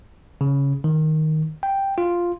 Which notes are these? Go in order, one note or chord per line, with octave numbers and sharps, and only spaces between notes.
C#3
D#3
G5
F4